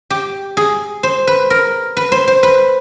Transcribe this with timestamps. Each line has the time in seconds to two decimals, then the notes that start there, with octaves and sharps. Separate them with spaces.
0.10 G4
0.57 G#4
1.03 C5
1.27 B4
1.50 A#4
1.97 B4
2.12 C5
2.28 C5
2.43 B4